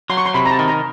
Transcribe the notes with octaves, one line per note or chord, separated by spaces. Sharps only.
F#3 C6
C#6
C6
C3 B5
A#5
A5
D#3
A#5